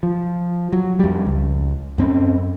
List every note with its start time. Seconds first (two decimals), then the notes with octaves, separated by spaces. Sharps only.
0.03 F3
0.73 F#3
0.99 F2 G3
1.26 C#2
1.98 F#2 C4 C#4